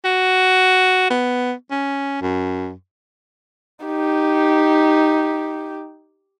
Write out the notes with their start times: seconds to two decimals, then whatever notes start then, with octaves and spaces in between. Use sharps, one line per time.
0.05 F#4
1.10 B3
1.71 C#4
2.22 F#2
3.86 D#4 G4